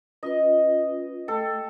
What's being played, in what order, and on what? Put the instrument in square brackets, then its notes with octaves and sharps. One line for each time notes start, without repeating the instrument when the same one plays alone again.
[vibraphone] C#4 F4 B4 [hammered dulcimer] D#5
[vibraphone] A3 G5 [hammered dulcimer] A4